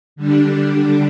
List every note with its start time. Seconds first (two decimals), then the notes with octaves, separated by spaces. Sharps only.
0.16 D3 G3 D4